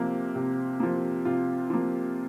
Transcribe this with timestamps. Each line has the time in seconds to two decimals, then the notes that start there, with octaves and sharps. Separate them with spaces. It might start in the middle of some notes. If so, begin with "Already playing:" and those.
Already playing: C3 F3 A#3
0.35 C3
0.80 F3 A#3
1.25 C3 F4
1.70 F3 A#3